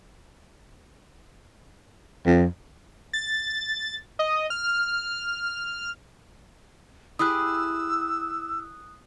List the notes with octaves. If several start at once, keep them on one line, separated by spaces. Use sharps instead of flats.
F2
A6
D#5
F6
E4 G4 G#4 D#6 E6 F#6